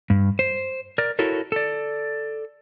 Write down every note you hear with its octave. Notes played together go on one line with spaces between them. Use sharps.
G2
C5
A#4 D5
E4 F#4 A4 A#4 C#5
A4 D5